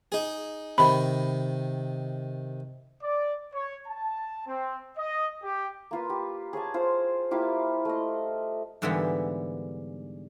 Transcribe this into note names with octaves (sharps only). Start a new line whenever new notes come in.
D#4 G#4
C3 D#3 B5
D5
C#5
A5
C4
D#5
G4
A#3 F4 B4
G4
G#4 C#5 G#5 A5
F4 C5
A#3 E4 F4 G4
A3 D#5
G#2 D3 E3 G3 A#3 B3